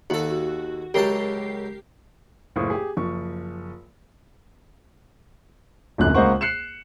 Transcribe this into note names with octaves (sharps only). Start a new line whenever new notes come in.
D#2 F#4 A4
C#2 F#3 G4 A#4 A5 C7
F#1 C#2 A2 C5 C#6 D#6
G4 G#4
F#1 F3 C#6
D#1 G#1 F#2 D3 F#6
C#2 G#3 A#3 C5 F#5 C#6
F#6 C7 C#7 E7